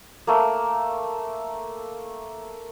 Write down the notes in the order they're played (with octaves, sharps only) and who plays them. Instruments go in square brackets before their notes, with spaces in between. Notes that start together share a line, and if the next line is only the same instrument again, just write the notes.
[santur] A3 A#3